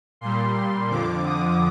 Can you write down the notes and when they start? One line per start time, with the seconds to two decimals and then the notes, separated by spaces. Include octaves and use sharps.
0.21 A#2 G3 C6
0.55 C6
0.90 F2 D3 F3 D6
1.25 D#6